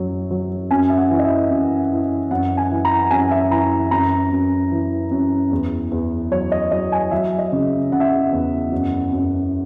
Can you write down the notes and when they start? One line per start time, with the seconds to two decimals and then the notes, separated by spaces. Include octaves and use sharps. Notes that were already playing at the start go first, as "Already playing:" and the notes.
Already playing: F#2 F#3
0.31 F#3
0.71 F#2 G#5
0.90 E5
0.97 F#5
1.10 E3
1.19 D#5
1.24 E5
1.50 F#2
1.91 E3
2.31 F#2 F#5
2.57 G#5
2.71 E3
2.85 A#5
3.11 F#2 G#5
3.31 E5
3.51 E3 A#5
3.91 F#2 A#5
4.32 F#2
4.71 E3
5.11 F#2
5.51 E2
5.91 E2
6.32 F#3 C#5
6.52 D#5
6.72 F#3 D#5
6.92 G#5
7.11 F#3 E5
7.39 D#5
7.52 C#3
7.92 C#3 F#5
8.00 E5
8.08 F#5
8.32 E2
8.72 F#2
9.13 F#2